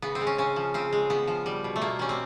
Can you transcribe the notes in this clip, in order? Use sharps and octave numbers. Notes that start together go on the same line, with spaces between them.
C#3 B3
C4
G#3
C#4
C#3 C#4
F3
C#3 C4
G#3
C#3 B3
F3
G3
B2
A3
B2 A#3
G3 C#4
C4